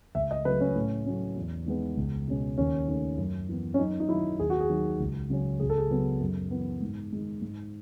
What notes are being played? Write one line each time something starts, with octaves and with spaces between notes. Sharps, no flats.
C#2 E5
D#5
C#3 F#3 A3 B4
C#4
A2
F#3 A3 C#4
E2
D#3 G#3 B3
C#2
B2 G#3 C#4
D#2 C#4
D#3 A3 C#4
F#2
E3 B3
C#4
F#2 D#4
D#4
D#3 F#3 E4
D#2 G#4
F#4
G#4
D#3 F#3
C#2
C#3 F#3 C#4
C#2 G#4
A4
G#4
C#3 F#3 B3
F#2
E3 B3
G#2
D#3 G#3
G#2